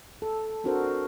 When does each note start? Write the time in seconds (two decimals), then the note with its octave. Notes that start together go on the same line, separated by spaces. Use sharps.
0.22 A4
0.64 C4 D4 F#4 A4 A#4 C5